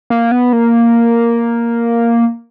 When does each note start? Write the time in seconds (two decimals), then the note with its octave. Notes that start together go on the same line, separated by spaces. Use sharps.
0.10 A#3
0.32 B3
0.53 A#3